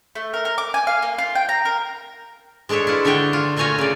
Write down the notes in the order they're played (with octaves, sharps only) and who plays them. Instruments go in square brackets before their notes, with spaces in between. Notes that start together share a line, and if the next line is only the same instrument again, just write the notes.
[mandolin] A3
A#4
A#4
D6
G#5
F5
A#3
F4
G5
A#5
A#4
[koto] G#3 D4 A4 C#5 E5
E4 F4 B4
D3 D4 C#5 E5 G5
F4
A#2 A3 F4 C#5 G#5 A#5
C#3 D5